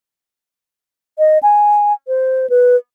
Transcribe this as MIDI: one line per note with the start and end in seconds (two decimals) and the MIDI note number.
1.19 1.38 75
1.43 1.93 80
2.08 2.49 72
2.50 2.76 71